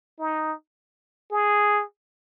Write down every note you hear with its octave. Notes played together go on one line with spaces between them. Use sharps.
D#4
G#4